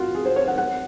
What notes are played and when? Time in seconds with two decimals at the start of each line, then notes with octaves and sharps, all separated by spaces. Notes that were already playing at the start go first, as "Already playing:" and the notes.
Already playing: F4 F#4
0.15 G#4
0.25 C5
0.36 C#5
0.48 F#5
0.58 F#5